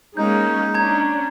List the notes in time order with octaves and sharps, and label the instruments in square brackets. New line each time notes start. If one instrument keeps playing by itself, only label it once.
[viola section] G#3 A#3 C#4 [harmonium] D#4 [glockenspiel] G6
[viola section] C#4 D4 [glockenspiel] A#5 G#6